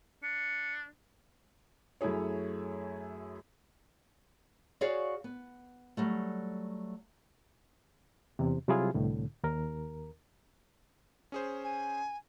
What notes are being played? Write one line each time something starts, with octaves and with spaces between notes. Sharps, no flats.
D4 C#7
F#2 A3 E4 G#4 C#5
F#4 G#4 C#5 D5 F5
B3
F#3 G3 A3
E2 C3
C3 F#3 G3 E4 F4 G#4
C2 A2 D3
D#2 A#4
C#4 G#4 C5
G#5